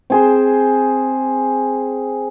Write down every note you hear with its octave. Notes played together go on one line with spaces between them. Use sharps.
C4 G#4 C5